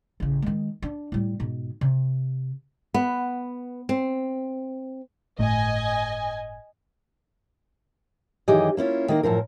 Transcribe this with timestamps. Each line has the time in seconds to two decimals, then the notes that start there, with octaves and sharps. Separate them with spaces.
0.20 A1 C#3
0.42 D#3 G#3
0.82 D4
1.12 A2 G3
1.40 G#2 B2
1.81 C3
2.94 B3
3.89 C4
5.39 G1 A2 A3 D#5 G#5
8.48 F#2 D#3 E3 G4 G#4 D#5
8.77 A#3 C#4 E4 F4
9.09 D#3 A#3 A#4
9.23 F#2 A2 F3 A#4